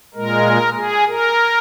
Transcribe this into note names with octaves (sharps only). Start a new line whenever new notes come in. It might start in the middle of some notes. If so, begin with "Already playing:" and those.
A#2 G#3 A#4
G#4
A#4